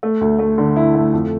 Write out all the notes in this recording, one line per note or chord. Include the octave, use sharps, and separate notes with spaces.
A3
D2
A3
D3
E4
A3
F2